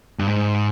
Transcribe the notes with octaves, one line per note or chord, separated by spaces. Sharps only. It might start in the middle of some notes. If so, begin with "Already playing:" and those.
G2
G#2